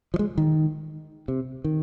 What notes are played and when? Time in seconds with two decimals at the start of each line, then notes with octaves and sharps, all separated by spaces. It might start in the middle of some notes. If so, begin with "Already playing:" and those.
0.14 F3
0.19 G#3
0.38 D#3
1.28 C3
1.64 D#3